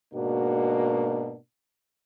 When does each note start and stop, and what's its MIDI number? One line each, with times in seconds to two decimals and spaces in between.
0.14 1.36 44
0.14 1.36 47
0.14 1.36 58
0.14 1.36 62
0.14 1.36 66